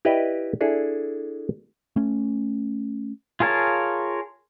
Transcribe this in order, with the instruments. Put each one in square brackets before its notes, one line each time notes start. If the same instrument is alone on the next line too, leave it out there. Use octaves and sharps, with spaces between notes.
[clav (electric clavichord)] E4 G4 B4 D5 D#5
D4 E4 G#4 A4
[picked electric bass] A3 C#4
[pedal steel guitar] F4 G#4 A#4 C#5 A5